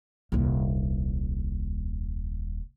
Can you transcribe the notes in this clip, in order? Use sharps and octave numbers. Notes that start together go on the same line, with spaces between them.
D#1 C2